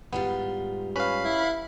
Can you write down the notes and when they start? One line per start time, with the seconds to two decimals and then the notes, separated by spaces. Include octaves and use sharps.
0.13 G#2 G3 B3 F4
0.96 C#4 B4 F5 B5
1.25 E4